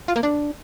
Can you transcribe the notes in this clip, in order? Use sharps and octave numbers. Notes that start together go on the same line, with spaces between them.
F4
A#3
D4